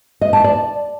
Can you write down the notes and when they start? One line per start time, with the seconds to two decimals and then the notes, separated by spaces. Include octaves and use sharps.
0.21 D#5
0.33 A5
0.44 D5